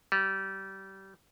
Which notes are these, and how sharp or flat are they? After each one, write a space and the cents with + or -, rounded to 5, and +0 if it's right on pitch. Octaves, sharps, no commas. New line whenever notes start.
G3 -25